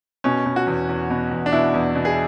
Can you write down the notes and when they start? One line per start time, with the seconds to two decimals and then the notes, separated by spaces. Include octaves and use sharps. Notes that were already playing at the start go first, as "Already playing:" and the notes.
0.24 B2 C#4
0.46 B2
0.56 F#4
0.67 E2
0.89 E2
1.10 B2
1.31 E2
1.46 D4
1.52 B2 E4
1.74 E2
1.95 B2
2.05 G#4